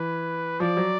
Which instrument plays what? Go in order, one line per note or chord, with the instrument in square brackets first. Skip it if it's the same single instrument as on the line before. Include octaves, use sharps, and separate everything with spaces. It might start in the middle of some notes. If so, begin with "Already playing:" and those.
Already playing: [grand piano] E3 [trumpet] B4
[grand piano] F3 [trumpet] D5
[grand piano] F#3